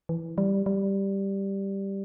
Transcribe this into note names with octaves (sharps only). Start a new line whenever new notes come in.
E3
G3
G3